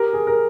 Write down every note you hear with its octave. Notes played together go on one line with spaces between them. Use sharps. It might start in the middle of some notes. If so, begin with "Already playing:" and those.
Already playing: G4 A#4
G#4
A#4